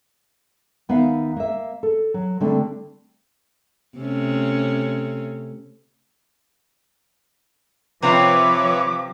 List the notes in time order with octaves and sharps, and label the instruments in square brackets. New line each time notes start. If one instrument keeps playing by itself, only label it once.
[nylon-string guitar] D#2 B3 D#4 E5 F5
A#3 E5
A4
F#3
D3 G3 A3 C4 D4
[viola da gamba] C3 A3 C#4
[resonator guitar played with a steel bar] C3 C4 F4 [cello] F3 [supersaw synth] B4 C#5 E5 [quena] D6